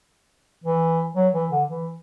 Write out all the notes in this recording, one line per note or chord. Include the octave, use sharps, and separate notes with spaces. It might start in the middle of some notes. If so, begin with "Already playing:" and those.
E3
F#3
E3
D3
E3